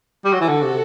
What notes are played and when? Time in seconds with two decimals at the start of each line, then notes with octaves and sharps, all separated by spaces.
0.25 G3
0.33 F#3
0.41 E3
0.48 D3 F#4 A4
0.63 C3